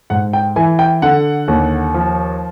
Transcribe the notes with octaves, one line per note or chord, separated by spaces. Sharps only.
G#2 F#5
G5
E3 G#5
G5
D3 F#5
D#2
F3